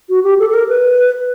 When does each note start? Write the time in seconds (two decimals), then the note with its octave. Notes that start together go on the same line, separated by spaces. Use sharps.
0.09 F#4
0.24 G4
0.39 A4
0.49 A4
0.54 A#4
0.68 B4